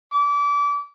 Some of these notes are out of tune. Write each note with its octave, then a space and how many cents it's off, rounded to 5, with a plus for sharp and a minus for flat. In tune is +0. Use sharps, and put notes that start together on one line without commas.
D6 -30